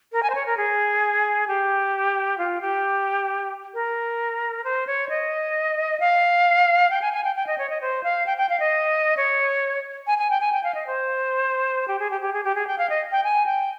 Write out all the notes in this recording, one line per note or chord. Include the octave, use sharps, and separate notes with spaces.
A#4
G#5
C5
C#5
A#4
G#4
G4
F4
G4
A#4
C5
C#5
D#5
F5
G5
G#5
G#5
G5
G5
D#5
C#5
D#5
C5
F5
G5
G5
F5
D#5
C#5
G#5
G#5
G5
G#5
G5
F5
D#5
C5
G4
G#4
G4
G4
G#4
G4
G#4
G5
F5
D#5
G5
G#5
G5